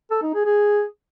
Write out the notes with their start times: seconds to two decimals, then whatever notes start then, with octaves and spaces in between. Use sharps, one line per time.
0.11 A4
0.22 D#4
0.34 G#4
0.46 G#4